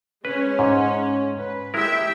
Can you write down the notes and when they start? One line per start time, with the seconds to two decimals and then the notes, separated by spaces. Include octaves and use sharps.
0.25 G#3 C#4 B4
0.59 G#2
1.38 B4
1.74 G#3 E4 G4 A#4 E5 G5